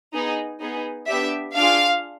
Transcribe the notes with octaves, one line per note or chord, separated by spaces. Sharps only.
B3 D#4 G#4
B3 D#4 G#4
B3 D4 G4 E5
D4 F4 G#4 F5